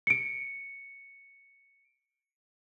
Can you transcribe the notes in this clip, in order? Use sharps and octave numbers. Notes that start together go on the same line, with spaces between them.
C#7 D7